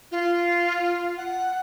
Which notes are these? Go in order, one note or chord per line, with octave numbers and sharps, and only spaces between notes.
F4
F#5